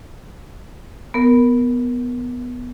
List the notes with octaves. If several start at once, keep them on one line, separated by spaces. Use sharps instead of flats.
B3 A#4